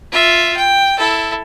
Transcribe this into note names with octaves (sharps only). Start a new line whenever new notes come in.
F4 E5
G5
E4 A4